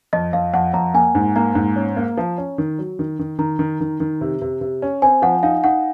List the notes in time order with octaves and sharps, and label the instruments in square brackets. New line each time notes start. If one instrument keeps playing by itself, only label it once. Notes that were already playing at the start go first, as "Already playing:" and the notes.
[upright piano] F2 [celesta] D#5
[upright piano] F2 [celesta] F5
[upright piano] F2 [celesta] F#5
[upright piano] F2 [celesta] A#5
[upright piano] A#3 [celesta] G#5
[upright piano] G#2
[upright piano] A#3 [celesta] A#5
[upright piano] G#2
C#4
A#3
F3
C#4
D#3
F#3
D#3
D#3
[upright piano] D#3 [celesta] A#5
[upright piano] D#3
D#3
D#3
C3
C3
C3
C#4
[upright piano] C4 [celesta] G#5
[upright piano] F3 [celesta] F#5
[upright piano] D#4 [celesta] F5
[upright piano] D#4 [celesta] F#5